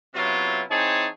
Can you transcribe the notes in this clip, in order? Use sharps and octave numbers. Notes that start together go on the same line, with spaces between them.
C3 F#3 B3 C#4 E4 F4
E3 C4 D#4 G#4 C#5 A5